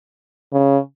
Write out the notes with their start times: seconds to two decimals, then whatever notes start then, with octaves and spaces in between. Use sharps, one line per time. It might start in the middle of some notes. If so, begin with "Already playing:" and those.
0.53 C#3